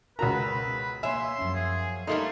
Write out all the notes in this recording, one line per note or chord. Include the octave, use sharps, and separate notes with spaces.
C#2 F#4 A#4 B4 A#5
B2
A#3 C#5 E5 G#5 C6
F#2 F3 C#4
G#4
G3 A3 A#3 D#4 A4 C6